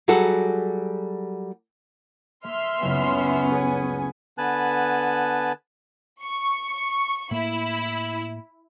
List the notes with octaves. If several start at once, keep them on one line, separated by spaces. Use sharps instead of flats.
F#3 G3 F#4 G#4 A4 F#5
A#3 E5 C6 F6
F#1 C#2 B3 C#4
G#4 G#5
D3 B3 B4 G#5 A5 F#6
C#6
A2 A#3 E4